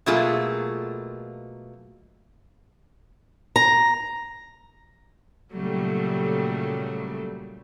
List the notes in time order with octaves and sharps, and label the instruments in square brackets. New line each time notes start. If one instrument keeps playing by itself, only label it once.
[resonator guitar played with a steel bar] B2 F#3 A3 A#3 F4 G#4
[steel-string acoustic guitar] A#5
[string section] A#2 C#3 F#3 G3 A3